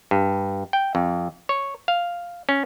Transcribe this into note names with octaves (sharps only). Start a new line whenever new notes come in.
G2
G5
F2
C#5
F5
C#4